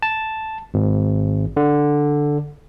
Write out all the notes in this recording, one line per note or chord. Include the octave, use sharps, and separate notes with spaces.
A5
G#1
D3